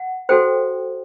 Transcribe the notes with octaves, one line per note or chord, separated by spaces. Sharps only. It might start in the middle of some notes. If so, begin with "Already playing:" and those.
Already playing: F#5
F#4 A4 C5 G5